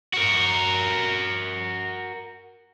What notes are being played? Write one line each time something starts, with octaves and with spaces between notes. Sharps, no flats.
F#4 A#4